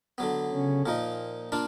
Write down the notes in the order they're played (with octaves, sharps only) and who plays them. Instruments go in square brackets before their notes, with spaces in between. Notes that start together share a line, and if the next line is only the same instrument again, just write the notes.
[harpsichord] D3 F#3 B3
[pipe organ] C#3 C#4
[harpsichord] A#2 F3 A#3 D#4
A#3 D4 F4